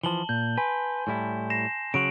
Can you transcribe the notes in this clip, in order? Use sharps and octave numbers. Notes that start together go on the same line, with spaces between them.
E3 F3 A5 F#7 G7
A#2 G6
B4 G#5 C6
A2 G3 E4
A#6 C7 E7
C#3 F#3 F#4 D7 F7 F#7